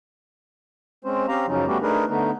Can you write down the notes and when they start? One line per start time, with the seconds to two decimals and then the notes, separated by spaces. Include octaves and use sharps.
1.04 G#3 C4 C#4 C5
1.28 C4 C#4 G4 F5 A#5
1.47 F#2 C#3 F3 F#3 C#4 D#4
1.67 G3 A3 B3 C#4 F#4 G4
1.82 A3 D4 D#4 G#4 A#4 B4
2.09 D3 A3 B3 D#4